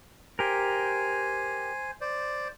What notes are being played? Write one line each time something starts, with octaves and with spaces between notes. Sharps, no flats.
G4 A#4 C5 G#5
C5 D5